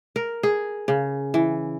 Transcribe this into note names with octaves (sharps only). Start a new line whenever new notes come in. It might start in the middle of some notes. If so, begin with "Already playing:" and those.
A#4
G#4
C#3
E3